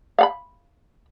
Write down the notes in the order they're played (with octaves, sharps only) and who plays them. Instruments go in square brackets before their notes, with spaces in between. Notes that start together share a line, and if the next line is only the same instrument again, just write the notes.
[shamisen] F5 F#5 B5